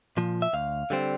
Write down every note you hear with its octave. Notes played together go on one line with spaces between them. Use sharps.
A#2 F3
E5
D2 F5
D3 G3 C4